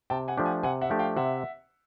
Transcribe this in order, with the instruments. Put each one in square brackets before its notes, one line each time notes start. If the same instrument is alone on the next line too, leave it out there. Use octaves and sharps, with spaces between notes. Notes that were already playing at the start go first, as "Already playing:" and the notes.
[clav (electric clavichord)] C3 [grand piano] G5 A5
[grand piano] F#5 G#5
[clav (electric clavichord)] F3 A3 D4 G4
[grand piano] F#5 G#5
[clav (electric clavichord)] C3 [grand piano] F#5 G#5
[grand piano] E5 F#5
[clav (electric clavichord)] F3 A3 D4 G4
[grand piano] F5 G5
[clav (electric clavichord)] C3 [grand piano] E5 F#5